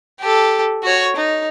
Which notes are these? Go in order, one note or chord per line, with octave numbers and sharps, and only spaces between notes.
G4 A4
F#4 C#5
D#4